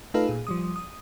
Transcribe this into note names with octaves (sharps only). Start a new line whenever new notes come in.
A3 D#4 F4 A4 B4 F5
A#2 G#4
F3 G3 D#6
D#6